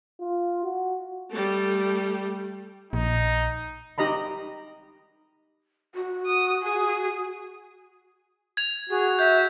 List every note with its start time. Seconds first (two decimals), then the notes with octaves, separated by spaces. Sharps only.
0.20 F4
0.63 F#4
1.31 G3 A3
2.93 A#1 D#4
3.98 D#4 G4 D#5 A#5 B5
5.95 F#4
6.26 D#6
6.63 G#4
8.57 G#6 F7
8.90 F#4 G#4
9.19 E5 G6